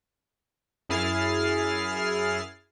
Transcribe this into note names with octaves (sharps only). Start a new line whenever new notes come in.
F#2 E4 G#4 F6 A6 C7